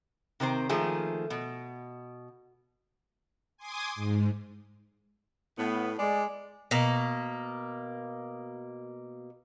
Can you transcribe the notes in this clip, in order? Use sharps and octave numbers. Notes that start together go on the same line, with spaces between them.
C3 D#3 C4 C5
D#3 F3 A3 A#3 G#4
B2
G#5 C6 D6 D#6
G#2
A2 B3
G#3 D5
B2 A#3